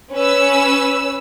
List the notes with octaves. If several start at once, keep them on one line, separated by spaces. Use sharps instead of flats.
C#4 B4 E6